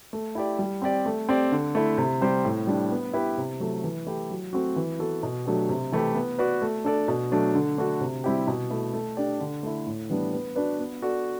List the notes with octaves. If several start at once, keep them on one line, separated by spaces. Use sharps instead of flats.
A3
E4 G4 D5
G3
C4 G4 D5
A3
C4 G4 D5
D3
A3 E4
C3
G3 C4 G4 C5
A2
G3 D4 G4
B3
E4 G4 B4
C3
F#3 A3
E3
A3 E4 G4
F#3
A3 C4 F#4
E3
B3 F#4 A4
B2
F#3 A3 D4 G4
C3
E3 A3 E4 G4
B3
F#4 B4 D5
A3
D4 A4 D5
B2
F#3 A3 D4
D3
A3 D4 F#4
C3
G3 C4 E4 G4
B2
A3 E4
A3
D4 G4 D5
D3
A3 E4
A2
E3 G3 B3 D4
B3
D4 F#4 B4 D5
B3
F#4 A4 D5